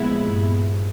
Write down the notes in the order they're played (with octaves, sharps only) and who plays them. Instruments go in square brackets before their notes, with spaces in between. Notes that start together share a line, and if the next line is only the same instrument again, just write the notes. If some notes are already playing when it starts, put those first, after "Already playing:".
Already playing: [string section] A#2 F3 G#3 B3 E4
[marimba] G2